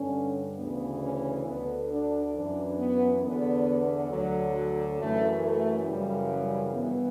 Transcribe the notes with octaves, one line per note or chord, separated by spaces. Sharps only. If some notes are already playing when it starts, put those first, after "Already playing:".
Already playing: G2 D3 C#4
D2 C#3 E3 B3
C#4
D2 D3 B3
D4
F#2 E3 D4
B3
E2 D3 B3
D2 D3 F#3
F#3
F#2 E3 A3
A3
F#2 C#3 E3 G3
G3
G2 E3 B3